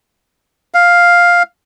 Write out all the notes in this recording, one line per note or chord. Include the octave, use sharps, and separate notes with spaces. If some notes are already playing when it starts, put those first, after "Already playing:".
F5